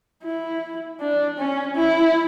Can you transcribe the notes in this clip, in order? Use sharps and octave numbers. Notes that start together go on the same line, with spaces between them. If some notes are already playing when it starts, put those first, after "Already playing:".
E4
D4
C#4
E4